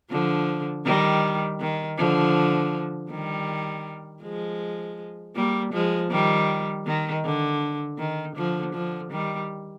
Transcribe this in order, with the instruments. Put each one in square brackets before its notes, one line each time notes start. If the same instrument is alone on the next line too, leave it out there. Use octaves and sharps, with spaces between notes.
[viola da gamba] D3 F3
D#3 G3
D#3
D3 F3
D#3 G3
F3 G#3
G3 A#3
F3 G#3
D#3 G3
D#3
D3
D#3
D3 F3
D3 F3
D#3 G3